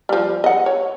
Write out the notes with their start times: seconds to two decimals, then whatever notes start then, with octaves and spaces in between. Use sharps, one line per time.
0.09 F3 G3
0.44 D#5 F#5
0.66 C#5